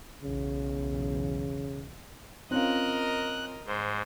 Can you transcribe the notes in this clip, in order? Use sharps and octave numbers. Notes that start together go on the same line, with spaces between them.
B1 E2 C#3
C4 C#4 F4 A#4 D#5 F#6
G#2 C5